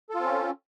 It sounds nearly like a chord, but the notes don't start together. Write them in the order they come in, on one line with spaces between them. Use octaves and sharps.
A4 F4 C4 C#4